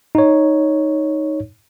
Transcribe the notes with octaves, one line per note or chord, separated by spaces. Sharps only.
D#4 C#5